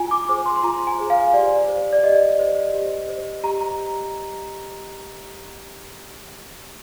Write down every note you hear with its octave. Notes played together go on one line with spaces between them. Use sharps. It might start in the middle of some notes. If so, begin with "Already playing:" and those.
Already playing: F4 G#5
D6
G#4 C5 D6
C6
C6
F4 A#5
G#5
G#4 C5
F5
G4 D5
C5
D5
G4 D#5
C5
G4
C5
G4 A#5
A#5